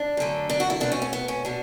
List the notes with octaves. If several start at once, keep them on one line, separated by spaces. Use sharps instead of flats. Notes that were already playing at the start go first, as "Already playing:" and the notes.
Already playing: D4
F#2 D3 A3
D4
F#4
E4
B2 A3 D4
C#4
C#4
B3
C#4
B2 D4